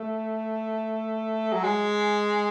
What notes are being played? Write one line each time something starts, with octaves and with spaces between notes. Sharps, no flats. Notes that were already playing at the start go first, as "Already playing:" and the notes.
Already playing: A3
F#3
G#3